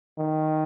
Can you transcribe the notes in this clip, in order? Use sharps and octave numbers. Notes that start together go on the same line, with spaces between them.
D#3